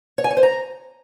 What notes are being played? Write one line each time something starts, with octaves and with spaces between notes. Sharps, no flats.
C#5
G#5
C#5
C5
A#5